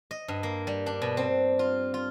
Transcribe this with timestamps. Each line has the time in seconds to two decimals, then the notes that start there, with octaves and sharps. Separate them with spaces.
0.11 D#5
0.28 G2
0.43 A#3
0.67 G3
0.86 D4
1.02 B2
1.17 C4
1.59 F4
1.94 F4